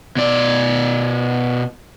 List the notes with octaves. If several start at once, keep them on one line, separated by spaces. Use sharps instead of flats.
B2 D5